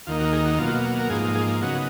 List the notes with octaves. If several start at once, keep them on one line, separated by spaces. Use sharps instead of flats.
D#2 D#3 A#3 D#4 F4
F#4
G#4
F#4
B2 F#3 A#3 F4
A#4
G#2 F3 A#3 D#4 G#4
G#4
C#3 F#3 B3 D#4 F#4